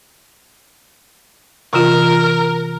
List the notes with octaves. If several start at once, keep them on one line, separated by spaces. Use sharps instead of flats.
C3 E3 F4 A#4